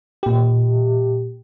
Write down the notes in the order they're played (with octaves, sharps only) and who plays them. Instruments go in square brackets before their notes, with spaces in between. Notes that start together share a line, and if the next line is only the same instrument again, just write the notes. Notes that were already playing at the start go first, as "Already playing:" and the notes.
[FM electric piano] A#2 G4